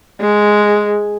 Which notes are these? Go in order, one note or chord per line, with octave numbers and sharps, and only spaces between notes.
G#3